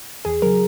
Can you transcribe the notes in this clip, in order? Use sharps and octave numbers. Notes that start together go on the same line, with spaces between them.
E2 G#4
C#3 F#3 A#4